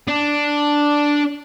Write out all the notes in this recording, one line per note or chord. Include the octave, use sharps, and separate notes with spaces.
D4